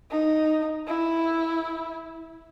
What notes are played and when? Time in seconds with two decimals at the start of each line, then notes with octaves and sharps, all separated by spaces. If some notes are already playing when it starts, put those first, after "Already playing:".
0.11 D#4
0.87 E4